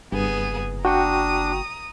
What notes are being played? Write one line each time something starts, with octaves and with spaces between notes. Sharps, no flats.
F#1 G2 B3 G#4
D4 F#4 G5 A#5 C#6 D#6